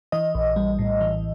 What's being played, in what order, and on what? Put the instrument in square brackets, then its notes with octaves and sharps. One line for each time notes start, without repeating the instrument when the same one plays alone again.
[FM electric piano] E3 D#5
A#1
G3
A2
E3